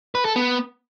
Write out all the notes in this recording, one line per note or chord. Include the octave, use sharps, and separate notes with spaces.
B4
A4
B3